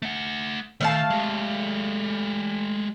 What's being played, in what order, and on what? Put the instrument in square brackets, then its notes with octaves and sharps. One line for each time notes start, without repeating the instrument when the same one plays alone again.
[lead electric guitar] A3 F#5
[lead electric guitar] D#3 [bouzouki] A3 F5 A5
[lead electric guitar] G#3 G4